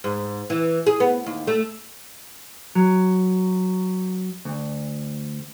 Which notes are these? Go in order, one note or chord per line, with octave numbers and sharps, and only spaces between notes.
G#2
E3
G#4
B3
D#2
A3
F#3
D2